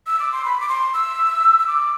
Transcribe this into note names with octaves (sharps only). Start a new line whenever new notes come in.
E6
D6
C6
B5
D6
C6
E6
E6
D6